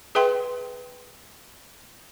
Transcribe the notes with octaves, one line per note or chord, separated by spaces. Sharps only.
G#4 B4 E5 G5 C6